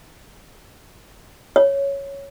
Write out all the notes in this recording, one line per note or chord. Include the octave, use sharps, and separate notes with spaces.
C#5